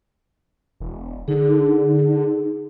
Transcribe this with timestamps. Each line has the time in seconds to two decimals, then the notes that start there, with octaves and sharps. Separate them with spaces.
0.80 E1
1.28 D3 D#4 G#4